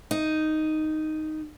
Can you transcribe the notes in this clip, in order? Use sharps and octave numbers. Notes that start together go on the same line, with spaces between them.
D#4